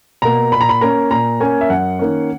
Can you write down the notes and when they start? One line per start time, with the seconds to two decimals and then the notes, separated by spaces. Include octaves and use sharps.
0.22 B2 A#3 A#5
0.52 A#2 B5
0.61 A#5
0.69 B5
0.81 A#3 C#4 A#5
1.11 A#2 A#5
1.40 A#3 C#4 G#5
1.61 E5
1.70 F#2 F#5
1.99 D#3 A#3 C#4